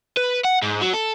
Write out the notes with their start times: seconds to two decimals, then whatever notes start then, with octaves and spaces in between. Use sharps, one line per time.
0.17 B4
0.45 F#5
0.62 G#2
0.82 F#3
0.94 A4